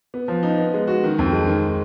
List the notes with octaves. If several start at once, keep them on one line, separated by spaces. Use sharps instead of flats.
B3
F3
D#4
B3
G#3
F#4
D#3
F2
G#3
D#3